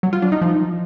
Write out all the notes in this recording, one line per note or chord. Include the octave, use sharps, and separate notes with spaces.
F#3
F4
D4
D#4
F3